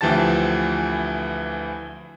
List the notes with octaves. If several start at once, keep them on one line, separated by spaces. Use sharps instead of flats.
D2 E3 F3 G4 A5 A6